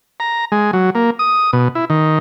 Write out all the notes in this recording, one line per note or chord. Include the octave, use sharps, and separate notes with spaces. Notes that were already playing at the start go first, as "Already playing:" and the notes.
A#5
G#3
F#3
A#3
D#6
B2
E4
D#3